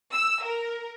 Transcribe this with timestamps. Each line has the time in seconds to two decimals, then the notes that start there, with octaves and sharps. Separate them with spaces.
0.12 E6
0.43 A#4